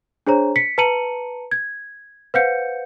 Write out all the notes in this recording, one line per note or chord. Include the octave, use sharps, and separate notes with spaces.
D4 G#4 C5 C#5 A#5
B6 C#7
B4 A5 A#5 C#7 D#7 F#7
G#6
B4 C5 F5 F#5 G6 C#7